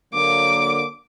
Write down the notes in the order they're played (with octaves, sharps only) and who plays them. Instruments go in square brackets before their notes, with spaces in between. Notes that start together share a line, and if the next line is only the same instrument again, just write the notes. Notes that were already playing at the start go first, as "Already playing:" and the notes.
[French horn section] D3 F#3 A#3 [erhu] D6